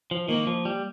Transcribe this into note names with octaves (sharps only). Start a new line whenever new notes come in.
F3
D#3 A#3
F3
G3